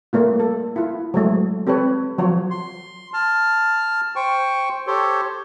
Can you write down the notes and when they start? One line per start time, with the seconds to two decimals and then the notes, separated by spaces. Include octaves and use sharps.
0.13 G3 A3 A#3 F4
0.40 A4
0.76 E4 F4
1.14 F#3 G#3 A3
1.67 C4 G4 A4 B4 C#5
2.18 F3 F#3 C#5
2.50 C6
3.14 A5 F6
4.16 C5 G5 C#6
4.87 G4 A4 C5 C#5